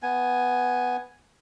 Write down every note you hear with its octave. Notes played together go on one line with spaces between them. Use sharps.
B3 G#5